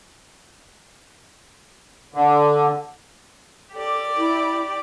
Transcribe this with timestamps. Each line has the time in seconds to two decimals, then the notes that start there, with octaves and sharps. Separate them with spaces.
2.14 D3
3.73 G4 A4 D5
4.16 E4